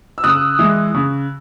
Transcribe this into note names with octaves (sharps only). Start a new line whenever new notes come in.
E6
C#3 D#6 F#6
E3 G#3
C#3